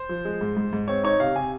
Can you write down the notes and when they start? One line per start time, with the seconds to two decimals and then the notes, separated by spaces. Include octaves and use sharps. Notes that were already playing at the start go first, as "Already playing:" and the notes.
Already playing: C5
0.09 F3
0.25 G#3
0.41 G#2
0.57 G#2
0.73 G#2
0.88 C4 C#5
1.03 D#4 C#5
1.20 C3 F5
1.36 C3 G#5